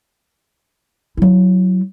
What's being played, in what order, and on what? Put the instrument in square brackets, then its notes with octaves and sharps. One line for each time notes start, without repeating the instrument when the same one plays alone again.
[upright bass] F#3 E4